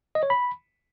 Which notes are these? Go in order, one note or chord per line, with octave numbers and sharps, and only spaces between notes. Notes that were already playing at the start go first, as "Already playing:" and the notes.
D#5
C#5
B5